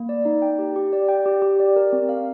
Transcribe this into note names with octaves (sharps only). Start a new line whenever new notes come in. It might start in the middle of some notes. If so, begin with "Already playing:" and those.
Already playing: A#3
D5
D#4
G5
G4
G4
D5
G5
G4
G4
D5
A#4
C4
F5